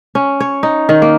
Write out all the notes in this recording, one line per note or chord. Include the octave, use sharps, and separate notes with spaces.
C#4
C#5
D#4
D#3
A#3